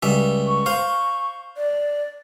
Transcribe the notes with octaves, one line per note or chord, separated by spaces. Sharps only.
C#2 G3 E5
C#6
C5 F5
D5